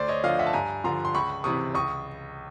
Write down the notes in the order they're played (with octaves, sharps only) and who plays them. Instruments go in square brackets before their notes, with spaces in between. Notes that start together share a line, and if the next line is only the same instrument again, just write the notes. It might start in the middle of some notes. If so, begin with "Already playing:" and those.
Already playing: [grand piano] D2 C5 D5
C#5 D#5
D3 F3 D#5 F5
E5 F#5
A5
G2 G#5 A#5
D3 F3 A#5 C6
C6
C#2 B5 C#6
C3 E3 C#6 D#6
C#2 C#6 D#6